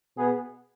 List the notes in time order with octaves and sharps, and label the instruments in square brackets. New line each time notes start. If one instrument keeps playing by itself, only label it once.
[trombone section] B2 B3 G#4